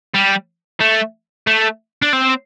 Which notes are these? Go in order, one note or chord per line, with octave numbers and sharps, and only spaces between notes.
G3
A3
A3
D4
C4